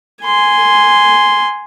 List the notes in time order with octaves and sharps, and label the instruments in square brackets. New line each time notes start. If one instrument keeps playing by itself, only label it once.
[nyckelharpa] G#5 C6